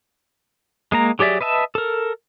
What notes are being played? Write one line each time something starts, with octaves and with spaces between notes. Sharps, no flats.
G#3 A#3 A#5
F#3 G4 G#4 D5 E5
B4 D#5 E5 A5
A4 A#4